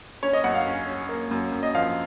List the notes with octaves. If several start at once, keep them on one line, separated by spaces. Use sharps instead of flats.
C#4 C#5
D#5
F#2 F#5
F5
C#4
C#4
A#3
F#2
F#2
D#5
F3 F5